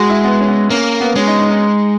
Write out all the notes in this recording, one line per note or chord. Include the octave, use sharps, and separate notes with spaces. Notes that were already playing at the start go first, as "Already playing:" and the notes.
Already playing: G#3 F#4 G#4
E4
B3
C#4
B3
A#3 C#4
B3
G#3 C#4
D#4
D#4
D#4